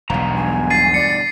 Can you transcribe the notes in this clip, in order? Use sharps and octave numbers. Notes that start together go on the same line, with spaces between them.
E1 B1 G2 B2 F5 A#5
G#5
A6 C7 D#7
D5 C#7